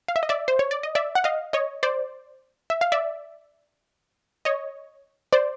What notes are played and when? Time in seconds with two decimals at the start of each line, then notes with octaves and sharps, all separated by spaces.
0.08 F5
0.16 E5
0.23 D#5
0.29 D5 E5
0.48 C5
0.59 C#5
0.71 D5
0.83 D#5
0.95 D5 E5
1.15 F#5
1.24 D#5 F5
1.53 C#5 D#5
1.83 C5 D5
2.70 E5
2.81 F5
2.92 D5 E5
4.45 C#5 D#5
5.32 C5 D5